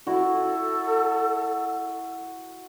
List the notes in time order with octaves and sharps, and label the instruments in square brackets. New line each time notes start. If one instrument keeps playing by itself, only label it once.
[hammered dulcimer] E4 F#4 [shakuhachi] A4